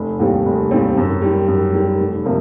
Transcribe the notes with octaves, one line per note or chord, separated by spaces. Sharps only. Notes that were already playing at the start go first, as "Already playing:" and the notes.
Already playing: F1
D#2 D#3 G3 C4
F1
D#2 D#3 G3 C4
F#2
D#3 G3
F#2
D#3 G3
F1
C3 F3 A#3